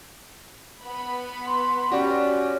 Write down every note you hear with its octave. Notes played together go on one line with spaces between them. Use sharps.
B3 B5
C6
C#4 F#4 G4 D5